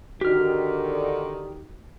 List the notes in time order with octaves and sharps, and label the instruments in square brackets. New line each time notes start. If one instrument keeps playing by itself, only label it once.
[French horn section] D3 D#3 [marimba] F#4 [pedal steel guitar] G4 F6